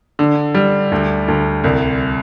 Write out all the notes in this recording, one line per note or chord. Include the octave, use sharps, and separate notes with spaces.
D3
G3
D2
D2
C2